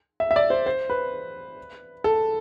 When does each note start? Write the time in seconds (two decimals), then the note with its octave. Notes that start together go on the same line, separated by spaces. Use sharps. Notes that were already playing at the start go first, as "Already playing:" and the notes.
0.20 E5
0.31 E5
0.36 D5
0.50 C5
0.66 C5
0.90 B4
2.04 A4